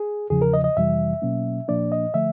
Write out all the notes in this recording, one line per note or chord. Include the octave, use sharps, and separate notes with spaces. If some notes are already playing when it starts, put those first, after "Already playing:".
Already playing: G#4
E2 C#3 F3 G#4
A#4
D#5
D#5
F2 C3 E3 G3 E5
B2 F#3 A#3 C#4
A#2 F3 A#3 D4 D5
D#5
D3 F3 A3 E5